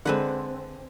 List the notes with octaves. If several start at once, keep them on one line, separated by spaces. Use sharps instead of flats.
D3 G#3 C4 B4 F#5